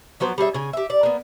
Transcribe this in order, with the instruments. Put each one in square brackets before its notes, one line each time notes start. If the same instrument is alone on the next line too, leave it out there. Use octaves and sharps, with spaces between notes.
[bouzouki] F3 F#3 B3 C5
G3 C#4 G#4 E5
C#3 G#5
G4 E5
D5
A#3 B3